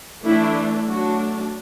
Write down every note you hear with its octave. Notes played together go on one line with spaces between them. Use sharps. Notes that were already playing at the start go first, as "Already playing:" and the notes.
E3 A3 D4 E4
F#3 A3 D4 F#4